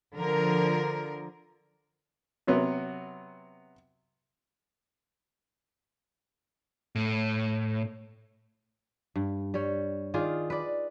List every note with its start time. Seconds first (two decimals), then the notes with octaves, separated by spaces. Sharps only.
0.14 D3 F3 A#4
2.47 C3 F#3 B3
6.95 A2
9.15 G2
9.54 G3 C#5
10.14 D#3 F4 G#4 D5
10.50 B4 D5